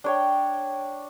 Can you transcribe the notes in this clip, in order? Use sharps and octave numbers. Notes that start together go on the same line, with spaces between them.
D4 C#5 G5